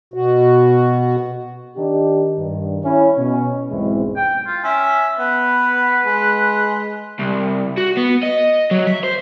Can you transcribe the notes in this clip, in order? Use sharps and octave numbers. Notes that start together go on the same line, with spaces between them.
B2 F#4
D#3 D4 D#4 G4
G2 D#3
C#4 E4
B2 C#4
B1 E2 G#2 G#3 C4 E4
G5
F4
C#4 E5
B3 B4
G#3
C2
F#4
B3
D#5
F#3
E5
C5